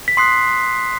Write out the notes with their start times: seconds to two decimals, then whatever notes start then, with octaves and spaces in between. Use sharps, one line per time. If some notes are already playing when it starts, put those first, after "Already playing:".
0.08 B6
0.17 C6 D#6 F#6 C7